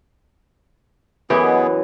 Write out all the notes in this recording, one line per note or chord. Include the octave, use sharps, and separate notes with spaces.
F#2 B2 E3 B3 G4 G#4 D#5